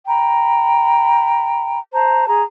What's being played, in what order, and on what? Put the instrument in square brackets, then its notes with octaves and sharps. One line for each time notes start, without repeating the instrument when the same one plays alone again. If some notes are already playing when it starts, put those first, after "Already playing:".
[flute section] G5 A#5 B5
C5 A5 A#5
G#4 A#5